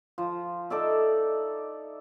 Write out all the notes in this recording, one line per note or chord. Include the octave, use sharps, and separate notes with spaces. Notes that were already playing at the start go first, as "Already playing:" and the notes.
F3
D#4 A4 D5 E5